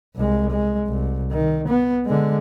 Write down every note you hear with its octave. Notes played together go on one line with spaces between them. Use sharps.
C2 G#3
G#3
C2
D#3
B3
D3 G#3